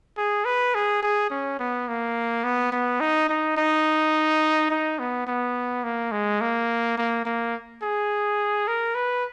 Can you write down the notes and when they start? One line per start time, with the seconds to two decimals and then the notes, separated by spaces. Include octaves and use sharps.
0.17 G#4
0.45 B4
0.75 G#4
1.02 G#4
1.30 C#4
1.59 B3
1.88 A#3
2.44 B3
2.72 B3
3.00 D#4
3.29 D#4
3.57 D#4
4.71 D#4
4.99 B3
5.27 B3
5.84 A#3
6.12 G#3
6.41 A#3
6.97 A#3
7.25 A#3
7.82 G#4
8.68 A#4
8.95 B4